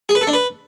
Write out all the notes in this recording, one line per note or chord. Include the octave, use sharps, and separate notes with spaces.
G#4
B4
A4
D4
B4